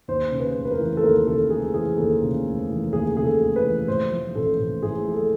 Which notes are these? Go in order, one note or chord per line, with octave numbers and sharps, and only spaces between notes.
D#2 C5
C#3
B4
F1
B4
A#4
E3
A4
D#2 A#4
C#3 A4
F1 G#4
E3 G#4
D#2 A4
C#3
F1
E3
D#2 G#4
C#3 G#4
A4
F1
B4
E3
A2 C5
F3
A1 A4
A1
A2 G#4
F3
A4